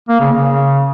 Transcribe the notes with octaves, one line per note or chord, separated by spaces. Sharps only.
A#3
C#3
C#3